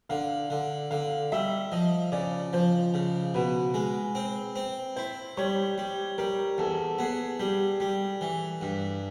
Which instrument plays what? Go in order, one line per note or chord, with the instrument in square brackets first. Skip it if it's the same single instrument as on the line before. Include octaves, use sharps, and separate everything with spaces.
[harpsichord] D3 [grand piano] F5
[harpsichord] D3
[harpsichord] D3 [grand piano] F5
[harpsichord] G3 [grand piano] E5
[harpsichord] F3 [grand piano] D#5
[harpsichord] C#3 [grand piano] D5
[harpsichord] F3 [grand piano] C5
[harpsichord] C#3
[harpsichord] B2 [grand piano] B4
[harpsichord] G#3
C4
C4
[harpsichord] E4 [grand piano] C5
[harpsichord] G3 [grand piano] C#5
[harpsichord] G3
[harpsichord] G3 [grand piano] A#4
[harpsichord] E2 [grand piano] A4
[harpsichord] B3 [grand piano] G#4
[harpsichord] G3 [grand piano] G4
[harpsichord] G3
E3
G2